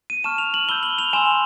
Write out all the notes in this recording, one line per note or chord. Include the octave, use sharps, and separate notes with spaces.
D#7
A5 C#6 F6 E7
F7
F#7
B5 E6 G6 G7
F#7
F7
G#5 C6 E6 E7